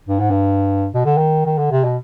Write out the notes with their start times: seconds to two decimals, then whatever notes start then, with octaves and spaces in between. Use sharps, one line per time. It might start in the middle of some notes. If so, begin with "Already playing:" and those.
0.08 G2
0.19 G#2
0.30 G2
0.94 B2
1.05 D3
1.17 D#3
1.46 D#3
1.58 D3
1.71 C3
1.84 B2